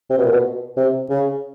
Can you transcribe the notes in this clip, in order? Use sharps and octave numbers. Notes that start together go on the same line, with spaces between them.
C3
B2
A#2
B2
C3
C#3